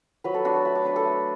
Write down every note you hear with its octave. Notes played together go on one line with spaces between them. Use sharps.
F#3 B4
A4
D4 F#4
A4
A3 B5
D6
D4 B4
A4
A3